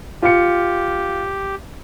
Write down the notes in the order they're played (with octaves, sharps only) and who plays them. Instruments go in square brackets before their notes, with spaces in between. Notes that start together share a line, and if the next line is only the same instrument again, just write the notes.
[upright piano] F4 C#7 [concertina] G4